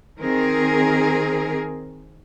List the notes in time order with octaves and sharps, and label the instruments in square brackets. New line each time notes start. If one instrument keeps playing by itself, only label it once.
[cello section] D#3 C4 G#4 A#4